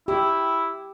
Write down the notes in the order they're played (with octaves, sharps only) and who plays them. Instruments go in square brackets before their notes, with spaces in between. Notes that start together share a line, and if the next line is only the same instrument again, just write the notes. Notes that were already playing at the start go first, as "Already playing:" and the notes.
[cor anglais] E4 [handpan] G4